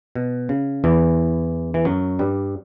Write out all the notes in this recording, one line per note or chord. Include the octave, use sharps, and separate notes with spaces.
B2
C#3
E2 E3
E3
F#2 F#3
G2 G3